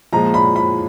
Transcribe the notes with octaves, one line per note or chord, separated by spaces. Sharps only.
A#2 F3 G#3 A#5
B5
B5